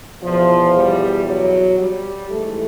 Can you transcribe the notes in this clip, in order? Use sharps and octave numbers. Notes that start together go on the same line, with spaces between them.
E2 B2 F3
G3
F#3
G3
G#2 E3 A3